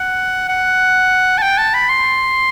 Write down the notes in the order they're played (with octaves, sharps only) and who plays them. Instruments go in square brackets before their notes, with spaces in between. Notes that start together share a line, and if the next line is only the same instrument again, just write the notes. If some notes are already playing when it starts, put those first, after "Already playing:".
Already playing: [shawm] F#5
F#5
A5
G5
A5
B5
C6